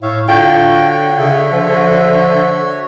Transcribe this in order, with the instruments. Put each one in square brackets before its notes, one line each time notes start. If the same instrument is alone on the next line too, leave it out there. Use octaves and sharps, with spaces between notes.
[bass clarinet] A2 [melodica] C#5 E5 F5
[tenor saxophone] D3 [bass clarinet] F4 [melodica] F#4 C#5 [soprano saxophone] G5
[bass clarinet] C#3 [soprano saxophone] E5
[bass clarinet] F3